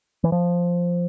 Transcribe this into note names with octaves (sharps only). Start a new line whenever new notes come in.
E3
F3